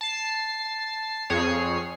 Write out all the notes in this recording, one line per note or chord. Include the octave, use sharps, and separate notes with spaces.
A5 C7
F2 G#4 C#5 C7